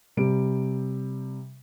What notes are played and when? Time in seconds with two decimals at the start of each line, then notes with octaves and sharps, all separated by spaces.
0.17 C3 G3 D7